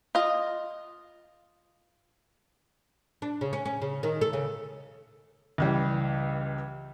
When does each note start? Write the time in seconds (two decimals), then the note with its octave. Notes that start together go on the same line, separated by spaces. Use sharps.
0.15 F4 D#5
3.22 D4
3.41 C#3
3.53 C#4
3.66 C#4
3.82 C#3
4.03 D#3
4.21 A4
4.33 C#3
5.58 C#2 E3 G3